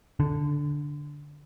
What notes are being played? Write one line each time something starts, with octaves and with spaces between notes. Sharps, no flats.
D3